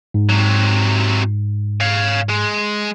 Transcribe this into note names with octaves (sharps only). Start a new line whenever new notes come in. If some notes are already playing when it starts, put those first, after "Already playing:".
G#2
C3 F#3
C#5 F5
G#3